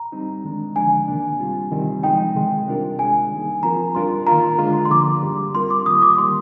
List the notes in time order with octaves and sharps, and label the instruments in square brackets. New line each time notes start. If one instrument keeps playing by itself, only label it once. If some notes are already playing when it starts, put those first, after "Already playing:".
Already playing: [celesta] A#5
[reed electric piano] G3 C4 D#4
D#3 G#3 D4
[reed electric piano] D3 F3 G#3 D4 [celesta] G#5
[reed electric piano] C3 D#3 A#3 D4
G3 C4 F4
C3 D#3 G3 C4
[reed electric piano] F3 G#3 D#4 [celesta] G5
[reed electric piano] C3 D#3 G#3
C3 G3 D4 F4 A#4
[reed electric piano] G#3 D4 G#4 [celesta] G#5
[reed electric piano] D#3 G3 A#3 D#4 G#4
[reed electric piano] F3 C4 F4 A#4 [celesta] A#5
[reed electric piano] G3 D4 F4 A#4 [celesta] C6
[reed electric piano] D#3 A#3 F4 A#4 [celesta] A#5
[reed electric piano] D3 G#3 D4 F4 G#4
[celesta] C6
[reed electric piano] D3 F3 A#3 [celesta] D6
[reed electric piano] G3 D4 G4
[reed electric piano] G3 C4 F4 A#4 [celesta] C6
[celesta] D6
[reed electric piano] D#3 G3 A#3 F4 [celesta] D#6
[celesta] D6
[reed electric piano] D#3 G3 A#3 [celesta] C6